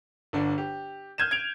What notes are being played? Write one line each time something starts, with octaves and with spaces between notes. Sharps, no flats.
G1 D3 D4
G4
F6 G6 G#6 D#7 E7
G#6 D7 F7